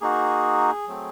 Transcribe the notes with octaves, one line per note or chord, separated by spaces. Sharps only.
A#3 D#4 F#4 G#4
F#3 A3 C4